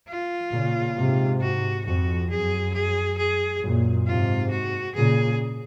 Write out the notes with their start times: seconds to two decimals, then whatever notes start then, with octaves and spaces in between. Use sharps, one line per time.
0.09 F4
0.52 A#2 C#3
0.96 G#2 C3
1.42 F#4
1.85 F2 F#4
2.30 F#2 G#4
2.74 G#4
3.18 G#4
3.62 F#2 A#2
4.07 G#2 C3 F4
4.51 F#4
4.95 A#2 C#3 G#4